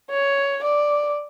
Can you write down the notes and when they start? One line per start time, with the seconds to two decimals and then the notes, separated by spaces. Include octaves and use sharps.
0.10 C#5
0.64 D5